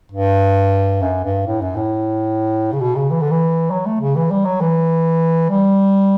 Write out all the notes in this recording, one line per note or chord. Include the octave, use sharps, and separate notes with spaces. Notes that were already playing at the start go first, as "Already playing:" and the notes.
G2
F#2
G2
A2
F#2
A2
C#3
B2
C#3
E3
D3
E3
F#3
A3
C#3
E3
G3
F#3
E3
G3